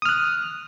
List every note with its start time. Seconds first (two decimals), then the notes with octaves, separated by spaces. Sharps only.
0.02 D#6
0.05 F6
0.09 F#6